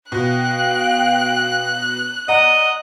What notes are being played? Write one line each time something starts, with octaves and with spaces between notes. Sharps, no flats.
B2 F5 G5 F#6
D5 D#5 F#5 A#5